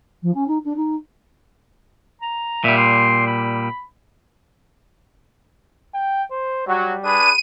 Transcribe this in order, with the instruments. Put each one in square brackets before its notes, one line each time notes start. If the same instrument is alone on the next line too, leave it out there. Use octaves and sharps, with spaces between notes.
[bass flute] F3
C#4
D#4
D4
D#4
[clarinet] A#5
[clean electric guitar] A#2 G3 [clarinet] E5
[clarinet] C6
B5
[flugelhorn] G5
C5
[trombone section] F#3 F#4 [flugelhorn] G3
[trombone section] D4 G#4 B4 [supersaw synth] D#7